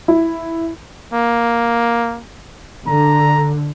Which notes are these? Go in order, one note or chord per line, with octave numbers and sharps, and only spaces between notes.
E4
A#3
D3 A#5